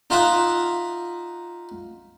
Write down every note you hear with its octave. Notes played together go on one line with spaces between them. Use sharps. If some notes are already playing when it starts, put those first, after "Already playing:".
D#4 F4 E5 F#5